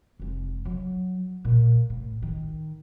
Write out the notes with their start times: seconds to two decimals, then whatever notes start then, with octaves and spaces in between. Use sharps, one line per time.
0.19 F1 G#3
0.65 F#3
1.45 A#2
1.90 A2
2.22 D#3